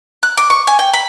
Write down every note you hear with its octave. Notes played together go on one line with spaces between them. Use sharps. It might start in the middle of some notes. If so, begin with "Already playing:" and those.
F#6
D6
C#6
G#5
G5
B5